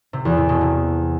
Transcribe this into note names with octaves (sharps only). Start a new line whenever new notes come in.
C3
E2
C3
B2
C3